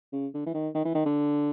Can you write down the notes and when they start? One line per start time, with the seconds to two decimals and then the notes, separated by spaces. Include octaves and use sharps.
0.13 C#3
0.34 D3
0.46 E3
0.54 D#3
0.75 D#3
0.85 E3
0.95 D#3
1.05 D3